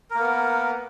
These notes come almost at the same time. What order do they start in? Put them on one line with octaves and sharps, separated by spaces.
A#4 A#3 B3